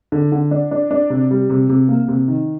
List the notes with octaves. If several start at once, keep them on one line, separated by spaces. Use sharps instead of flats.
D3
D3
D4
D4
D4
C3
G3
C3
C3
A#3
C3
D#3